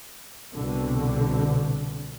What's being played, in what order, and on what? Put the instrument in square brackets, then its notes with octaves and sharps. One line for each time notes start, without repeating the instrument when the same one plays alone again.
[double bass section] C2 B2 D3